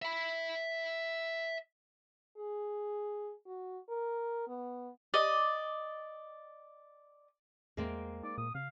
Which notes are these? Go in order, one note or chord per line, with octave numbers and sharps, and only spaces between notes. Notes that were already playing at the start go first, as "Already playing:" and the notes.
E5 B5
G#4
F#4
A#4
B3
D5 D#5
E2 G#3 A#3 C4
D#4 D5
A#2 D#6
C#3 F5